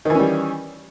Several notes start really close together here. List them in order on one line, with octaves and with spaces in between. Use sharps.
D#3 E3 C#4 G3